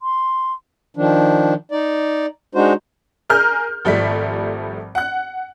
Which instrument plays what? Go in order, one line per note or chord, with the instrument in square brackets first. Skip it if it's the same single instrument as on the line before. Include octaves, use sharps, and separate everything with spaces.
[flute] C6
[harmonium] D#3 F3 D4
D#4 D5
G#3 D4 D#4 F#4 C5
[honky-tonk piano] G#4 A#4 F6 G6
G#1 F3 G3 A3 B6
F#5 F#6